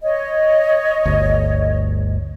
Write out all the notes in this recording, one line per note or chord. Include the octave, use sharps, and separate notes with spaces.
C#5 D#5
G1 D2